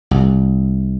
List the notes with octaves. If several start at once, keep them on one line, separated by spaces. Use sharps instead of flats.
C2